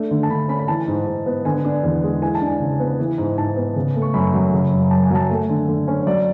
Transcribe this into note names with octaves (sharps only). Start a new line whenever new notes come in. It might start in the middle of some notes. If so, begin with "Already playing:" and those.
Already playing: A3 D4
D3
A5
D3 B5
C#4 B5
B5
E3 A5
G#2
G#2
B3
D3 G#5
D4
E2
G#3
E3 G#5
A5
D4
G#5
C#3
B3
E3
G#2
G#2 A5
B3
C#3
A3
C#6
F#2 B5
F#3
C#3
F#2
F#2 A5
G#5
F#3 A5
A3 G#5
D3
D3
C#4 C#5
C#5
F#3 D5